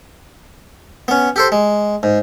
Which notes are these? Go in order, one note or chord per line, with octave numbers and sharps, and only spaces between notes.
B3 C#4
G4 A4 C5
G#3
G#2